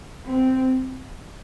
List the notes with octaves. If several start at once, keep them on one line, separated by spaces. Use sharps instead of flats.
C4